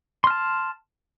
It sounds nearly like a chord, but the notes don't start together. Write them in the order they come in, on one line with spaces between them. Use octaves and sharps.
C6 F6 A5